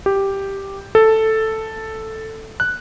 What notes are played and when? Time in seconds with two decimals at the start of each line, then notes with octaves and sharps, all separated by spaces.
0.06 G4
0.95 A4
2.60 F#6